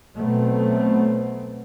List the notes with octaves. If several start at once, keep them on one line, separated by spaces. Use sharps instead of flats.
B2 F#3 A3 B3 C4